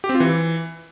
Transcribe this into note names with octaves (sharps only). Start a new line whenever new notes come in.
G4
C4
F4
E3